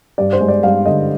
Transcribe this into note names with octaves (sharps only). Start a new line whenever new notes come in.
G2 D5
C5
G#3
D5
G2 F5
D3 D#5